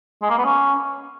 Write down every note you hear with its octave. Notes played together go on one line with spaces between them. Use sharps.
G#3
A#3
B3
C#4